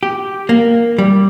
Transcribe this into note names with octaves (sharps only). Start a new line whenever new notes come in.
G4
A#3
G3